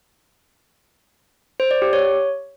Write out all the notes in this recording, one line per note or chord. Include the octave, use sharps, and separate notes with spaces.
C5
D5
G4
C#5